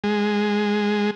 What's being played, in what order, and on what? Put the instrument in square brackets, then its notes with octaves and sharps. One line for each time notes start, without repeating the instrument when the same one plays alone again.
[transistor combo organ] G#3